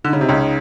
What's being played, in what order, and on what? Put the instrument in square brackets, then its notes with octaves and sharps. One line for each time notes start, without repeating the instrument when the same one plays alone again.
[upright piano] D3 [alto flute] D#4
[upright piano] C#3
C3
C#2 C#3